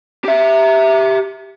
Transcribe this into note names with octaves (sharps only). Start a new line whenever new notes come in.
G4 E5